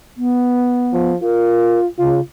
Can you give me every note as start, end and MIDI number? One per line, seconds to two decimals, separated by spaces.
0.17 1.12 59
0.93 1.16 53
1.22 1.87 65
1.22 1.79 70
1.98 2.20 49
1.98 2.20 65